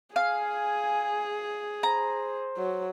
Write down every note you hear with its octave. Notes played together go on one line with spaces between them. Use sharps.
G#4 F5 G#5
C5 A#5
F#3